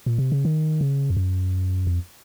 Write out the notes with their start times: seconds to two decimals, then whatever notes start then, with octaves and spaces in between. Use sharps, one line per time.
0.06 A#2
0.18 C3
0.32 C#3
0.45 D#3
0.81 C#3
1.10 F2
1.17 F#2
1.87 F2